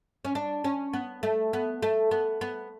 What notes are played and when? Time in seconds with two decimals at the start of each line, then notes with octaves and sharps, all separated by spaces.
0.25 C#4
0.35 D4
0.64 C#4
0.93 B3
1.23 A3
1.53 B3
1.82 A3
2.11 B3
2.41 B3